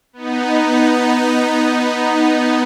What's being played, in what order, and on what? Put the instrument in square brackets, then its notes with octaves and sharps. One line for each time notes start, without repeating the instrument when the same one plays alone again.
[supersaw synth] B3 D#4